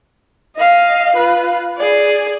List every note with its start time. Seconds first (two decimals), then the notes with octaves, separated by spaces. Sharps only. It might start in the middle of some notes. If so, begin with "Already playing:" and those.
0.56 D#5 F5
1.16 F4 B4
1.77 G#4 D5